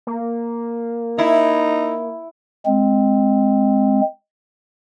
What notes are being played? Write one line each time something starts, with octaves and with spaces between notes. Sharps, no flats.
A#3
D#4 E4
G#3 C4